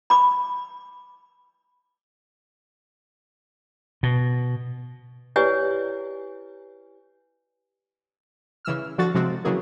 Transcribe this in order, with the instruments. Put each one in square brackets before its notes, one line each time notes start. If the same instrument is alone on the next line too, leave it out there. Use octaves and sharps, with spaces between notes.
[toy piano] B5 D6
[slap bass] B2
[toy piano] E4 G4 B4 C#5 D5 G#5
[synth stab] C#3 E3 E6 F6
D3 F3 F#4 A6
C3 F3 G#3 C4 F#4
C#3 E3 F#3 A3 A#3 G#4